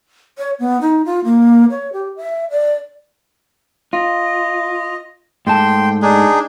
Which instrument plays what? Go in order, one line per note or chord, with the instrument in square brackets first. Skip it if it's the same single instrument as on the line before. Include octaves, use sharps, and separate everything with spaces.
[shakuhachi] C#5
B3
D#4
F4
A#3
C#5
G4
E5
D5
[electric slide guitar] F4 [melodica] D#5
[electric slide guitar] G#2 A3 A5 [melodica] G5 C6
[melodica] D4 D#4 G#4